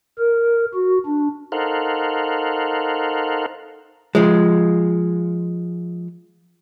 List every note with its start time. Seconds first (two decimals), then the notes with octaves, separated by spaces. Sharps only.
0.18 A#4
0.74 F#4
1.06 D4
1.52 D#4 A4 A#4 C5 F5 F#5
4.15 F3 G#3